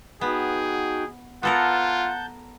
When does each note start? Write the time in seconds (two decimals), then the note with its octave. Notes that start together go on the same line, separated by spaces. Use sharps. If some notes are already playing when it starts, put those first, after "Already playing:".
0.21 B3 D#4 F#4 G#4 G5
1.43 B3 F4 A4 A#4 F#5 A5 G6